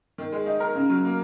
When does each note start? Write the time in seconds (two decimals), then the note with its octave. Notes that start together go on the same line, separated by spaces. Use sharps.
0.18 D#3
0.32 G#3
0.46 D#4
0.60 A#4
0.75 C#3
0.90 F#3
1.05 A#3